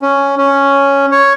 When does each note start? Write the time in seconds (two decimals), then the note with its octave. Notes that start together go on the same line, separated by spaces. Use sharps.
0.02 C#4
0.38 C#4
1.12 C#5